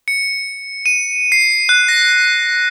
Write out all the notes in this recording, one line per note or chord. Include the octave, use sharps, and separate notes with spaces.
C#7
D#7
C7
F#6
A#6